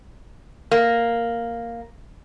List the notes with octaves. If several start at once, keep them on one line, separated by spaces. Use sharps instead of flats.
A#3